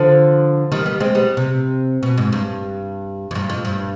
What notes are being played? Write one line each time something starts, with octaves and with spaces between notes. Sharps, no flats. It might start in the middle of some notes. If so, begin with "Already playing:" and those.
Already playing: D3 F3
D#3 G3
G3 B3
G#3 C4
G3 B3
C3
B2
G#2
G2
F2
G2
F2
G2